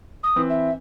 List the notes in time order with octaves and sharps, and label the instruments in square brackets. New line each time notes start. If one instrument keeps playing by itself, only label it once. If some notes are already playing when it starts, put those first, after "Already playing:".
[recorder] D#6
[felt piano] E3 C4 B4
[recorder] E5